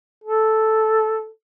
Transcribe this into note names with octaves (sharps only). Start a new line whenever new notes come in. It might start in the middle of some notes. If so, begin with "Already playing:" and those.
A4